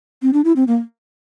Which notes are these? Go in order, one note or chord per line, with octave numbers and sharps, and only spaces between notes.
C4
D4
E4
C4
A#3